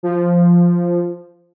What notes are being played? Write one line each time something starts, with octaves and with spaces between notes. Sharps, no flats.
F3